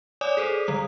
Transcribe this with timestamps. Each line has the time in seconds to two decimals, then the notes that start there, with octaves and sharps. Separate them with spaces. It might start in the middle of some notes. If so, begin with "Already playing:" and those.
0.21 C#5 D5 G#5 D6 D#6
0.37 G#4 A4 C5
0.67 D3 G3 D#6